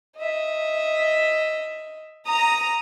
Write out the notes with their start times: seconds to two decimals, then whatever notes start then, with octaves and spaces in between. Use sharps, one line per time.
0.17 D#5 E5
2.26 A#5 D#6